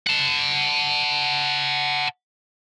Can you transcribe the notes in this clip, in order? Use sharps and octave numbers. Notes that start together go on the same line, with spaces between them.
F#5 A5